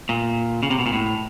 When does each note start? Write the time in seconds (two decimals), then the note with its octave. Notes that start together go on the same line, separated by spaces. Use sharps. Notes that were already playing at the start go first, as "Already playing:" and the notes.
0.09 A#2
0.63 C#3
0.70 C3
0.79 B2
0.86 A#2
0.93 A2